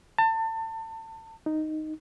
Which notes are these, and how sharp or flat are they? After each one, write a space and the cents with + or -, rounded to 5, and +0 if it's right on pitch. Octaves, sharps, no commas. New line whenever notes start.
A5 +30
D#4 -5